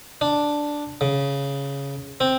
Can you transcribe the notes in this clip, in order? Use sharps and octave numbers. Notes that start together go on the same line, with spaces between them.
D4
C#3
C4